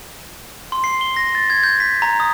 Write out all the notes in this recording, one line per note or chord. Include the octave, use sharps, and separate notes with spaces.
C6
C7
G7
A#6
A6
G#6
G6
B6
A#5
D#6